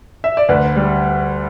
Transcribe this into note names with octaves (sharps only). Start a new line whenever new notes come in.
E5
D5
D2 B4
G3